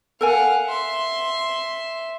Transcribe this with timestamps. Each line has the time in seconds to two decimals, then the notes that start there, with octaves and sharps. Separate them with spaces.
0.21 A4 A#4 F5 F#5 G#5
0.68 E5 C6